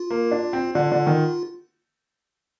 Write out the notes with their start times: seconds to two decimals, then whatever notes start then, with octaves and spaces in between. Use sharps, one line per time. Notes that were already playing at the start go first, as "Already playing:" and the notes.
Already playing: F4
0.11 A#3
0.32 D4
0.53 C4
0.75 D3 F4
0.92 D3
1.07 D#3